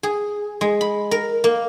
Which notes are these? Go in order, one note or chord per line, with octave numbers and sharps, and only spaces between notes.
G#4
G#3
B5
A#4
A#3